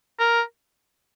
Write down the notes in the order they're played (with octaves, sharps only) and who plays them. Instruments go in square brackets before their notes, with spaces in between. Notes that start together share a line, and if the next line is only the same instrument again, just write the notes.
[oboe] A#4